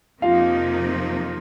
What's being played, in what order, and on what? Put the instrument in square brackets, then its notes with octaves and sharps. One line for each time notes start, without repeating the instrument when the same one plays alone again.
[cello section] F2 C3 F3 A#3 D#4 [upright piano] F4 F5